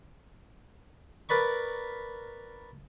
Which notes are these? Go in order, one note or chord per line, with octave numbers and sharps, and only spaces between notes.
A#4 B4 D5 B5 C#6